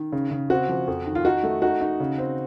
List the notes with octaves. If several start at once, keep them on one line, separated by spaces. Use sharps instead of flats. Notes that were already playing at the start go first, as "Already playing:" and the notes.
Already playing: D#3
C#3
C#3
C4 F#4
F3
F2
D#3
F4
D#4 F#4
A3
D#4 F#4
D#4
C#3
C4